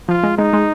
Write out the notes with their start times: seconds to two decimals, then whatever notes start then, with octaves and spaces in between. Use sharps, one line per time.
0.09 F3 F4
0.23 G#3
0.38 G#3 D#4
0.53 G#3